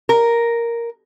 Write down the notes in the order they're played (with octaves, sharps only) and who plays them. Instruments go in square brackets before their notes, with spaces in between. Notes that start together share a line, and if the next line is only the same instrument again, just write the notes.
[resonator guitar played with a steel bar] A#4